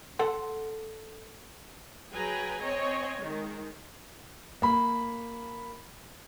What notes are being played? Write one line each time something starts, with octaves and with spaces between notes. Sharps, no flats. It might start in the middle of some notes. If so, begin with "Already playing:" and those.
A4 F#5 C6
F#3 G#4 B4 G5 G#5 A#5
C4 C#5 D#5 G#5
D#3 G#3
A#3 B5